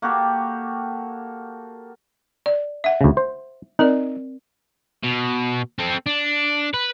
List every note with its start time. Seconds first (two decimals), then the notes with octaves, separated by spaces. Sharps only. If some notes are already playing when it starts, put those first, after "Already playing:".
0.02 A#3 F#4 G4 A4
2.46 D5
2.84 E5 F#5
3.01 D2 C#3
3.17 C5
3.79 C4 D#4 A#4 D5
5.04 B2
5.79 C4 A4
6.06 D4
6.74 B4